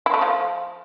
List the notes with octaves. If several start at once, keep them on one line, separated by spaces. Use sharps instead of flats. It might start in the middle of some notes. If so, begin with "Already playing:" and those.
E4
A3
F3